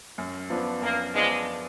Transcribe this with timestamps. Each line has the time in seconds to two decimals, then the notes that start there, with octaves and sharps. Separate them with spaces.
0.18 F#2
0.50 F3 B3 D4 F4
0.82 F#2 A#3
1.15 F3 G#3 B3 D4 F4